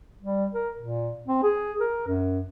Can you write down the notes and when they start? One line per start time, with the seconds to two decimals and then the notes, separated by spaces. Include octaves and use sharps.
0.22 G3
0.54 A#4
0.79 A#2
1.28 C4
1.43 G#4
1.80 A#4
2.07 F#2